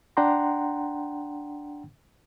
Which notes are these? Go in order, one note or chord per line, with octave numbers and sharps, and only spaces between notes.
D4 F#5 G5 A#5 C6